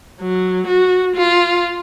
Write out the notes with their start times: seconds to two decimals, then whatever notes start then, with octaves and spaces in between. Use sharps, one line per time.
0.20 F#3
0.65 F#4
1.14 F4